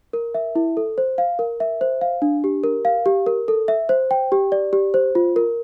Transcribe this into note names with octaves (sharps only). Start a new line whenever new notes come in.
A#4
E5
E4
A4
C5
F5
A#4
E5
C5
F5
D4
G4
A#4
F5
G4
A#4
A4
E5
C5
G5
G4
D5
G4
C5
F4
A#4